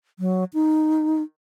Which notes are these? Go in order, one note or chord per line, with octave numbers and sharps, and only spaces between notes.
F#3
D#4